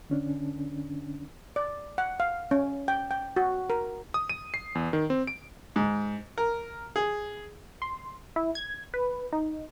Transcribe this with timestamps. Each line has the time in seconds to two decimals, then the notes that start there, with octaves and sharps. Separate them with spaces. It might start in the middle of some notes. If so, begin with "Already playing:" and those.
0.10 D3 C#4 D4
1.56 D5
1.98 F#5
2.20 F5
2.51 C#4
2.88 G5
3.11 G5
3.36 F#4
3.70 A#4
4.14 D#6
4.30 D#7
4.54 C7
4.75 E2
4.93 D#3
5.10 C4
5.27 D7
5.76 G#2
6.38 A#4
6.96 G#4
7.82 C6
8.36 E4
8.55 G#6
8.94 B4
9.33 D#4